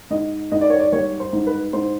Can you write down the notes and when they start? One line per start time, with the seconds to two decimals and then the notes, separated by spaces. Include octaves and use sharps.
0.11 G#2 D#5
0.52 G#2 D#5
0.61 D5
0.70 C#5
0.79 D5
0.92 G3 C#5
1.20 C5
1.33 G#2
1.47 B4
1.73 G#2 C5